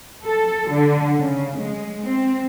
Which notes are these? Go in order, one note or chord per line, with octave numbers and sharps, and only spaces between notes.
A4
D3
C#3
G#3
C4